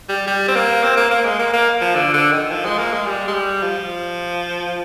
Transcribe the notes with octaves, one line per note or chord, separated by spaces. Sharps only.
G3
G3
C4
A#3
C4
A#3
A#3
G#3
A#3
A#3
F3
D3
D3
D#3
F3
G#3
A#3
G#3
G3
G#3
G3
F3